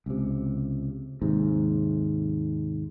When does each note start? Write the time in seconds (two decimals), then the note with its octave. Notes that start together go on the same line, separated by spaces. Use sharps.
0.06 C#2 C3
1.22 D#2 G#2 C3